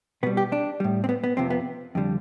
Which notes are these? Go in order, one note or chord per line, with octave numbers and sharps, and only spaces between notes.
B2 G3 B3
G4
D4
A2 G3
C4
B3
B3
F2 C3 F3 C4
B3
F2 D3 G3